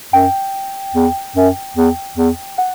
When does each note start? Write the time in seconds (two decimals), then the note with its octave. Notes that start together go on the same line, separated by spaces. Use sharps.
0.13 F#2 G5
0.94 E2
1.36 F#2
1.76 E2
2.17 E2
2.58 F#5